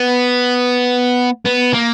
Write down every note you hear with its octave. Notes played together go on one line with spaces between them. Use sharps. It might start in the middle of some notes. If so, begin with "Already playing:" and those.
Already playing: B3
B3
A#3